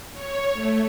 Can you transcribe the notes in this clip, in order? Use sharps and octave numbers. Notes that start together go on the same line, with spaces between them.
C#5
A3